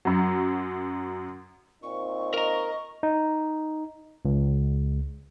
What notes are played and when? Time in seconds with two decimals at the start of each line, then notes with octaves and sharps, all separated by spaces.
0.05 F#2 F#3
1.83 A#2 C4 D#4 C#6
2.34 A#4 D#5 A#5
3.03 D#4
4.25 C#2